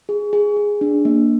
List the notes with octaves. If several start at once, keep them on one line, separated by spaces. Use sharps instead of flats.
G#4
G#4
G#4
D4
A#3